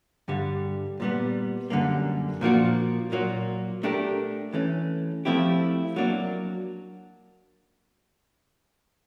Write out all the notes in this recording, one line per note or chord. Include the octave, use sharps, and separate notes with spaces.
G2 D3 G3
A#2 G3 B3
F#2 D3 G3 A#3
A#2 F3 A#3 D4 F#4
A#2 F#3 A#3
A3 D4 G4 A#4
E3 A3 C#4
F3 A3 C4 E4 G4
F#3 A#3 D4